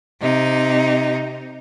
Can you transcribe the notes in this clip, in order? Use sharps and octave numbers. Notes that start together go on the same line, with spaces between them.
C3 D#4